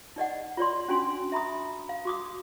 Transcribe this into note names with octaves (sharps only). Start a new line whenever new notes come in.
D#4 D5 D#5 F#5
F4 C#5 D5 C6
C#4 D4 F#4 G#5 C6
E5 A#5 B5 D#6
F5
F#4 D6 D#6